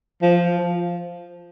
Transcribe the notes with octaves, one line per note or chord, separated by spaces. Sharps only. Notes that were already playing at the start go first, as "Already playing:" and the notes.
F3